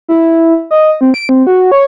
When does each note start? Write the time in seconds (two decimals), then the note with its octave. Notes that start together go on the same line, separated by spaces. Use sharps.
0.09 E4
0.71 D#5
1.01 C4
1.14 D7
1.29 C4
1.47 F#4
1.72 C#5